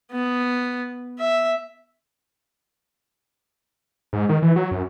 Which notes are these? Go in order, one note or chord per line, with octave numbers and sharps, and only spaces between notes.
B3
E5
G#2
D#3
E3
F#3
F#2